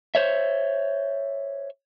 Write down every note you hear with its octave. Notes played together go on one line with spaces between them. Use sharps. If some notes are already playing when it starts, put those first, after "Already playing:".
C5 C#5 E5